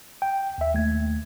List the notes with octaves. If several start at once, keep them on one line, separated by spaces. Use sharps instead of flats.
G5
D#2 E5
D#2 A3 G#6